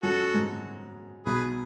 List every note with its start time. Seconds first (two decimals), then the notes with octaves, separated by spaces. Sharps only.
0.03 F#2 F#3 F#4 A4
0.34 G#2 G#3
1.26 B1 B2 G#4 B4